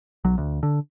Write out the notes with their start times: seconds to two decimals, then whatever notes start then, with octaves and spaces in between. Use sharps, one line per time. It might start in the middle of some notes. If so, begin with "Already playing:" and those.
0.24 B1 F#3
0.38 D2
0.63 D3